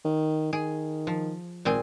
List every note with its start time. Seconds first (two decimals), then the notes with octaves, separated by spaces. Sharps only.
0.05 D#3
0.53 D#3 G#4
1.07 F3
1.65 G#1 A#2 C4 G#4